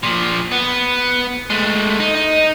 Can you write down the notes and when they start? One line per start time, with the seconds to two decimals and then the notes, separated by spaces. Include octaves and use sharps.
0.03 A#2 F3
0.52 B3
1.50 G#3 A3
1.99 D#4
2.15 D#4